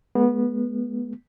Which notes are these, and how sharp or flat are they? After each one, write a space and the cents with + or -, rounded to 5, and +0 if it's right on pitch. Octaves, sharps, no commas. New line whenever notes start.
G#3 +30 B3 -20